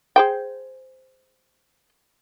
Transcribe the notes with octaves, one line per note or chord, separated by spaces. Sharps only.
G#4 C5 G5